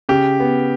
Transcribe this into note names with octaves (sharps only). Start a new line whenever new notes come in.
C#3 G4
B3